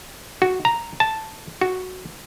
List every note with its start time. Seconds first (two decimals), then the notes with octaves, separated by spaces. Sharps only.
0.42 F#4
0.65 A#5
1.00 A5
1.61 F#4